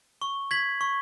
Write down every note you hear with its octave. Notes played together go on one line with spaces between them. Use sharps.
C#6
G#6 B6 F#7
C#6